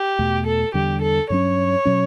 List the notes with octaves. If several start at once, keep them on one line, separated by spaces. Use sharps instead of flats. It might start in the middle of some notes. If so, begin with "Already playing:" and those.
Already playing: G4
E2 B2 A3
A4
E2 D3 G3 G4
A4
G2 F#3 C#4 C#5
B2 F#3 C#4